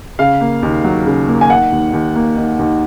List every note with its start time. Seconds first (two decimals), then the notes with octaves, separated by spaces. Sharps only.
0.19 C#3 F5
0.41 A#3
0.63 D#2
0.84 F#3
1.06 C#3
1.28 A#3
1.41 G#5
1.49 D#3 F#5
1.72 D#2
1.93 D#2
2.16 A#3
2.37 D#3
2.59 D#2